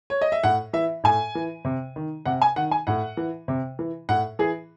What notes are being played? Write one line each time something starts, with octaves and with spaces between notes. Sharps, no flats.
C#5
D#5
E5
A2 F#5
E3 E5
A2 G#5
E3
C3
D#3
C3 F#5
G#5
D#3 F#5
G#5
A2 F#5
E3
C3
E3
A2 F#5
E3 G#4